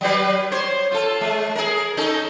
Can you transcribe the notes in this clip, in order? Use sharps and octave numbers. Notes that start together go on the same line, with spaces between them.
F#3 G3 B4
C5 C#5
F4 A4
G#3
G#4 A#4
C#4 D#4 A4